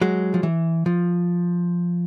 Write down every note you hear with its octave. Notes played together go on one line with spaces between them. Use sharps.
F#3 G#3
F3
E3
F3